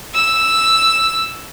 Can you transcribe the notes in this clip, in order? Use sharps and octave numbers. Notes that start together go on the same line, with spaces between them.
E6